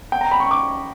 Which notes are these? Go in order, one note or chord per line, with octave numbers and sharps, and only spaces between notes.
G5
A#5
B5
C#6
D6